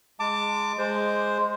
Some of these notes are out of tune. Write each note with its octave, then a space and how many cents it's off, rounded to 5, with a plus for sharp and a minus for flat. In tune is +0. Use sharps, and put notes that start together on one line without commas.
G#3 +0 A5 +30 D6 +0
G#3 +0 C5 +0